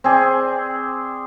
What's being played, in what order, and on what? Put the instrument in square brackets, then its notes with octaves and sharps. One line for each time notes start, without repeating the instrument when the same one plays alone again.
[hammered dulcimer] C4 G#4 D5